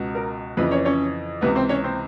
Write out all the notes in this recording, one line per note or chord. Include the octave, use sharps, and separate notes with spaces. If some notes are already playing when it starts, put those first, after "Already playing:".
Already playing: C#2 B2
A#4
F2 C#3 E3 B3 B4
C#4 C#5
C#4 C#5
C#2 C3 E3 B3 B4
C4 C5
C#4 C#5
C4 C5